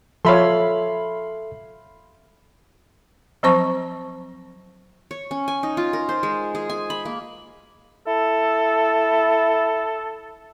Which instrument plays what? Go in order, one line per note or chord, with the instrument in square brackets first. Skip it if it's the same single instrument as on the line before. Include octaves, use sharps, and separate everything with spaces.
[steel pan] F3 C#5 [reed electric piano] A4 E5 [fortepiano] F5 B5 C6
[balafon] F3 F#3 C4 C5 A5 C#6
[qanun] C#5
C#4
G#5
D#4
F4
A#4
C5
G#3
G#4
G#5
B5
A#3
[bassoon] E4 [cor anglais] A4